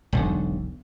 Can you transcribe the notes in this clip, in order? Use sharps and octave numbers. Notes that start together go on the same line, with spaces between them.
E1 B1 D3